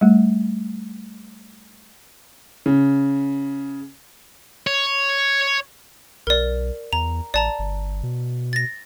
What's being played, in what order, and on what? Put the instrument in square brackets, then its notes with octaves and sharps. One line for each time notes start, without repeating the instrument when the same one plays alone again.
[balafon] G3 A3
[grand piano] C#3
[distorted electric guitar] C#5
[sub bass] B1 [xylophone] A#4 D5
[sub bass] E2 [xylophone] A#5
[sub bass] A1 [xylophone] D5 A5 A#5
[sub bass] G1
B2
[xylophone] A6 A#6